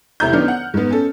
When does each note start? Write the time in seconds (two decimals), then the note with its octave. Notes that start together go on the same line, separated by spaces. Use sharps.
0.20 F1 E4 A#5 G6
0.32 F#2 D#3 B3 D4 F6
0.48 F#5
0.74 G#2 B3
0.91 C#4 A4